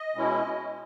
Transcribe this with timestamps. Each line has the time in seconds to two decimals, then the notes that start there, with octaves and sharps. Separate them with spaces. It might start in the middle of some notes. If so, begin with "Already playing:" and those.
Already playing: D#5
0.15 B2 G#3 C#4 E4